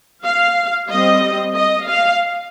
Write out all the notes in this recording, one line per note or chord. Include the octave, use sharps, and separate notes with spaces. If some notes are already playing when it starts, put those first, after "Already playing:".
F5
G3 C4 D#5
D#5
F5